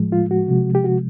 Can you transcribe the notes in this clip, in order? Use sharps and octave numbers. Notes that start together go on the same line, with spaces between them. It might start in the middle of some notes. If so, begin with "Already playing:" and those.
Already playing: A2 F3 G#3
F4
F#4
C3 F3 G#3
G4
F#4